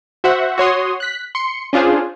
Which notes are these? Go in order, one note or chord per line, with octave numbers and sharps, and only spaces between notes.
F#4 C5 E5 F#5
F#4 C#5 C6 D#6
F#6 B6
C6 C#7
C#4 D4 F4 G#4 C5